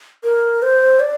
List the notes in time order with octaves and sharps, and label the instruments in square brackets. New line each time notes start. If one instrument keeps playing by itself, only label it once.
[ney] A#4
C5
D5